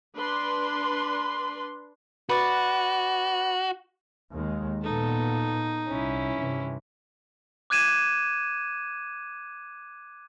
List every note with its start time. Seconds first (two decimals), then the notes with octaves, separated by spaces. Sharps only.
0.16 D4 B4 C6
2.29 F#4 B4 D5
4.35 D#2 D#3 G#3
4.84 A#2 B3 D#4 A4
5.88 C2 C#4 E4
6.38 G2 C3 E3
7.70 D6 F#6 G#6 D#7 E7